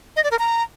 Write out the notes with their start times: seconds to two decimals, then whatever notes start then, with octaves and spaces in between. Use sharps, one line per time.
0.16 D#5
0.24 D5
0.31 A#4
0.39 A#5